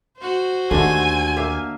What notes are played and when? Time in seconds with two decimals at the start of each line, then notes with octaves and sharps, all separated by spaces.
0.19 F#4 C5
0.71 D#2 D3 A3 G#5
1.36 A#3 E5 F5